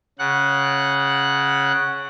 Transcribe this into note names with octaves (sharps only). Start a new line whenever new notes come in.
C#3 F#5 F#6